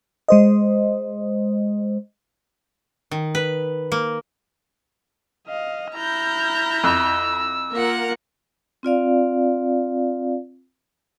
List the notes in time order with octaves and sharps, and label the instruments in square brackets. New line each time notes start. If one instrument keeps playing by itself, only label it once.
[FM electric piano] G#3 C5 D#5
[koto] D#3
B4
A#3
[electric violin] D#5 F5
[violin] E4 A#5 [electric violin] F6 G6
[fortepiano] F2 [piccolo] E6
[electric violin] A#3 F4 [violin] A#4 F#5
[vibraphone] C4 F4 D5 F5